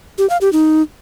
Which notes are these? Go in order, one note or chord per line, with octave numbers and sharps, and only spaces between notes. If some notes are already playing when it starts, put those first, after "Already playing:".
G4
F5
G4
D#4